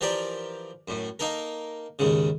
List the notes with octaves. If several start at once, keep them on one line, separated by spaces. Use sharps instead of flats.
E3 F3 G4 A#4 D5
F#2 A2
A#3 D#4 A4 A#4
D#2 G#2 C#3